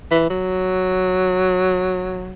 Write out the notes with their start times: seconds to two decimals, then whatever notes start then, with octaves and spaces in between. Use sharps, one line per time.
0.11 E3
0.30 F#3